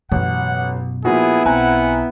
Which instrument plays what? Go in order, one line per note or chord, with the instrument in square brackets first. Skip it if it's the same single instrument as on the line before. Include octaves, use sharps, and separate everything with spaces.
[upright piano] A1 [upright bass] F#2 B2 [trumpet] F#5
[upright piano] A#2 F3 F#4 [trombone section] B3 E4 [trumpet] G#4
[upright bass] B1 [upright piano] C4 G#5 A#5 [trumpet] F#5